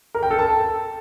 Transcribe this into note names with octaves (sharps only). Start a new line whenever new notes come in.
A#4
G5
A4
A5